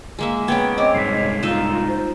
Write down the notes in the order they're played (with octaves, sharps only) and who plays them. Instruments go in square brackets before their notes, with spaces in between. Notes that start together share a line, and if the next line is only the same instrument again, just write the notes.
[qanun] G#3 A#3 E5
[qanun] B3 C#4 [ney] G5 [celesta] G#6
[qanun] C4 [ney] C#5 [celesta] D#5 D6 D7
[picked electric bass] C2 G#2 [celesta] B6 C7
[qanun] D#4 D#5 [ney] F4 [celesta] E6 E7
[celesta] F4 [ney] C5